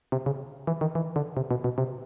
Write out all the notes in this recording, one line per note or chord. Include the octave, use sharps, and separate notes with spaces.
C3
C#3
E3
D#3
E3
D3
C3
B2
B2
C3